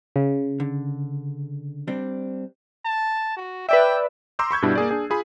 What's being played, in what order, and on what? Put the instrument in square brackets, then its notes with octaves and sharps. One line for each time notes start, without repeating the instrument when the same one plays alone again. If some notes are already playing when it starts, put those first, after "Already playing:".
[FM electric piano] C#3
[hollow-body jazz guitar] D3
G3 C4 D4
[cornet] A5
F#4
[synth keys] B4 D5 E5 [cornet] G5
[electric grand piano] A#5 C6 D6 E6 G6
B5 C#6 G6 G#6
G2 B2 G3 D4 E4
A#3 G#4 D5
D4 G#4
F4 G#4 B5